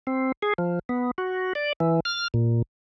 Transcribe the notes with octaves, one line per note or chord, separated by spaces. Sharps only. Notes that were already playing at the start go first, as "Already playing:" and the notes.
C4
G#4
F3
B3
F#4
D5
E3
F6
A#2